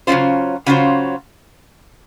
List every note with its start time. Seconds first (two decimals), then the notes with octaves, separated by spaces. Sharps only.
0.07 C#3 F#3 C#4 F4 C5
0.66 C#3 F#3 C#4 F4 C5